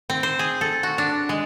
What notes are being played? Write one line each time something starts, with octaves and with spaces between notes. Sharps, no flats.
C4
C5
G#4
A4
F#4
D4
G#3